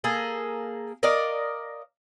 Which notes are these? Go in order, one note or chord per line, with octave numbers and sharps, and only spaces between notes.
A#3 G#4 A4
A#4 D5 D#5 F5